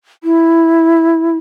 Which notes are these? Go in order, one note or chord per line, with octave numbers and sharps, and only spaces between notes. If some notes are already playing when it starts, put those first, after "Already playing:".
E4